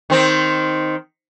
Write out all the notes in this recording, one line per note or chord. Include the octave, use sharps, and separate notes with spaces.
D#3 C4